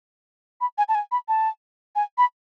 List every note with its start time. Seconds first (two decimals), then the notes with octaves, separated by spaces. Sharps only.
0.61 B5
0.78 G#5
0.89 A5
0.95 G#5
1.12 B5
1.28 A5
1.95 G#5
2.18 B5